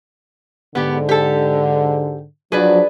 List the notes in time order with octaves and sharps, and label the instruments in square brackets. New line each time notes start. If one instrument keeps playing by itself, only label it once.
[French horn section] G#2 D3 [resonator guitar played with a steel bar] B3 G4
[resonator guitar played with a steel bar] G4 A4
[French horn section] F3 F#3 D4 [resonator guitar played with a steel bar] G#4 B4 D5